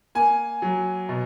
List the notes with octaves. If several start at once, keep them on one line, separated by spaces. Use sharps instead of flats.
A#3 G#5
F#3
B2